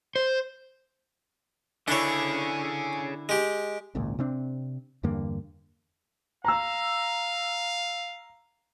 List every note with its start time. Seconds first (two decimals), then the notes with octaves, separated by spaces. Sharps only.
0.16 C5
1.88 D3 C#4 D4 E4 G#4 C#5
3.29 G#3 G4
3.95 G#1 C#2 A#2
4.19 C3 C4 D4
5.03 E2 G2 D3 A#3
6.44 F5 A#5 E6